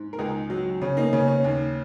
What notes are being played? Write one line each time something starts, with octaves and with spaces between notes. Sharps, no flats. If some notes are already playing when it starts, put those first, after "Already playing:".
Already playing: G#2
A#4
C#2 D#4 G#4
F#3
C#3 C#4
A#3 D#4
C#3 C#4
C#4
D#2